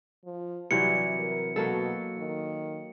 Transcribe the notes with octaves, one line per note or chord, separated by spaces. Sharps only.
F3
C3 E3 F#3 G3 C#7
A#4
B2 F#3 A#3 A4
D#3